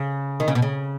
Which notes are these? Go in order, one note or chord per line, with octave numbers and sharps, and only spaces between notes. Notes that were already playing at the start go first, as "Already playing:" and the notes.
Already playing: C#3
D#3
C#3
B2
C#3